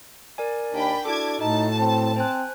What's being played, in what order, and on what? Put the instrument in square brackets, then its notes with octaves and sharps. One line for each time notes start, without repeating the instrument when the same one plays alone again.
[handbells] A#4 D5 G#5
[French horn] D#2 [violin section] D4 G5 B5
[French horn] D4 [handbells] E4 F#4 A4 [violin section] A5 D6 G#6
[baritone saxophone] A2 [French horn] D#4 [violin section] A5
[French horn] C4
[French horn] C4 [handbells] C5 G#5 F#6